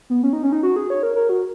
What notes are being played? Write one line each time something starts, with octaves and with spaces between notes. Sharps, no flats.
B3
C#4
D#4
C#4
D#4
F#4
G#4
C#5
A#4
A#4
F#4